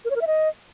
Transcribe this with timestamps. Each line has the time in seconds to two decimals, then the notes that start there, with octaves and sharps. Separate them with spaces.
0.05 A#4
0.10 C#5
0.16 A#4
0.21 E5
0.27 D#5